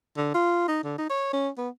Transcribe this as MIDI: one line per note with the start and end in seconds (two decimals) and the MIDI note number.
0.17 0.33 50
0.34 0.66 65
0.68 0.80 63
0.84 0.95 50
0.98 1.07 63
1.10 1.32 73
1.33 1.49 61
1.58 1.69 59